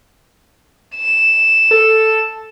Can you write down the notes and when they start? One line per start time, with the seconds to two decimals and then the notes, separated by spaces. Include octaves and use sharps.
0.95 E7
1.71 A4